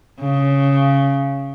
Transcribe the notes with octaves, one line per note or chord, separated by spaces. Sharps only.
C#3